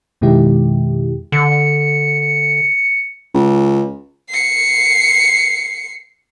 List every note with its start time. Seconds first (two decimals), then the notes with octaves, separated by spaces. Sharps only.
0.21 F2 B2 D#3 G#3 E4 G4
1.32 D3 C#7
3.35 C#2
4.30 C7 C#7